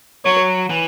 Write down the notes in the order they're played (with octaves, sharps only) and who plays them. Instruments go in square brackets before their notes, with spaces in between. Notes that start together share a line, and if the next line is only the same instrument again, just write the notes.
[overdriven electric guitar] F#3 [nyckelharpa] C#5
[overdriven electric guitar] E3